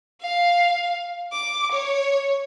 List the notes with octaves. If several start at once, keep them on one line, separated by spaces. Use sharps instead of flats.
F5
D6
C#5